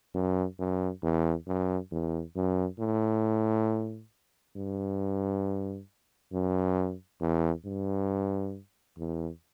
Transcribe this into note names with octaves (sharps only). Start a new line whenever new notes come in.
F#2
F#2
E2
F#2
E2
F#2
A2
G2
F#2
E2
G2
E2